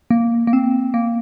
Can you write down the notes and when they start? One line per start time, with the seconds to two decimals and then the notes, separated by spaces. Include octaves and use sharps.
0.11 A#3
0.47 A#3
0.53 C4
0.94 A#3